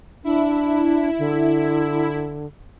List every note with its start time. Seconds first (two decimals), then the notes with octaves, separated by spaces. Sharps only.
0.24 D4 E4
1.19 D3